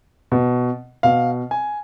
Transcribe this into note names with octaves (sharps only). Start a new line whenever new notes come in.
B2
B2 F5
G#5